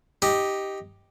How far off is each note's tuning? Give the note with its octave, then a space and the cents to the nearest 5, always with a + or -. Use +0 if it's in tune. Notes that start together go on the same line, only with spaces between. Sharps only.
D#4 +0 G4 +0